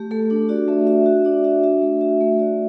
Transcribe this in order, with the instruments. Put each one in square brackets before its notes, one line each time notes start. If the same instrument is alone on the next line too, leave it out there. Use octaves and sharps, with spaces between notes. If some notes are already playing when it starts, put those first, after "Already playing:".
Already playing: [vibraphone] A3 G4
A3 A4
D4 G4
F#4 D5
A3 E5
F#4 E5
F#4 E5
D4 D5
F#4 E5
F#4 E5
A3
F#4 E5
A3 E5
F#4 D5